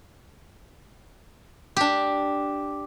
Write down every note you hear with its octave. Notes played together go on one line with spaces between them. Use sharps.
D4 G4